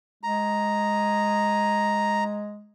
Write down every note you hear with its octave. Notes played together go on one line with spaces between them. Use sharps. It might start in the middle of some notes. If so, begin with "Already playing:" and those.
G#3 A#5